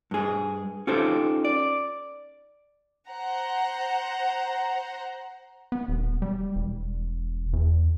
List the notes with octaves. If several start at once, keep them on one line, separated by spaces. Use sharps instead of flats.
G2 G#4
C#4 D#4 F4 G4 A4 C5
D5
C5 F#5 A#5
B3
D#1
G3
E1
E2